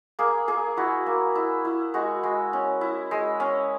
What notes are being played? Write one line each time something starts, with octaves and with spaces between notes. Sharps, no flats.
A#3 G#4
A#3 G#4
E4 F#4
A#3
E4
E4
G#3 F#4
G#3
C#4
E4
G#3
C#4